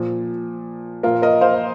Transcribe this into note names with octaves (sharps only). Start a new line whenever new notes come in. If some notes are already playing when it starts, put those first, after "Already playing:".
Already playing: A#2 F3
A#2 F3 F4 A#4
A#4 D#5
C5 F5